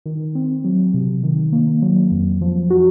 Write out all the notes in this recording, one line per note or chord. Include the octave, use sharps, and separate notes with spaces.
D#3
C4
F#3
C3
D#3
A#3
F#3
F2
F3
F#4